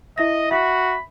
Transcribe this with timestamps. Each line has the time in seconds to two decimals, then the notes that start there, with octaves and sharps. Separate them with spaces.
0.18 E4 D#5 E5 A#6
0.51 F#4 E5 B5